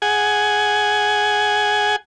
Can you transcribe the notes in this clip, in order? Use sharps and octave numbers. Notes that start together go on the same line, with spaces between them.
G#4 F#5 G#5